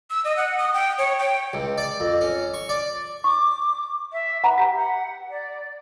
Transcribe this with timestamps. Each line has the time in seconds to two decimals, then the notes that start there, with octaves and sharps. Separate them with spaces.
0.10 E6
0.24 D#5
0.37 F#5
0.58 D#6
0.74 G5
0.98 C#5
1.19 G5
1.54 C#2
1.78 D5
2.00 F2
2.21 C#4
2.54 C#6
2.69 D5
3.24 C#6 D6
4.12 E5
4.44 B4 F#5 A#5
4.58 G4 B6
4.77 F#5
5.30 D5